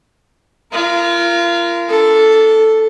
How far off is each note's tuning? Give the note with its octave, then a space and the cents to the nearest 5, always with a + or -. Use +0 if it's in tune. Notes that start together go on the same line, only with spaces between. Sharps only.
F4 -35 A#4 +0
D4 -30 A4 +0